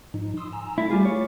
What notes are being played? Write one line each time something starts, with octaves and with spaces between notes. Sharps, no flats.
G#2 F3 D#4
C6 D#6 E6
G#5 A#5 E6
A3 E4 A6
G3 F4 G#4
C#5